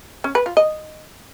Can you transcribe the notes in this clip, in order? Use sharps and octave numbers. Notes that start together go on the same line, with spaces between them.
C#4
B4
F4
D#5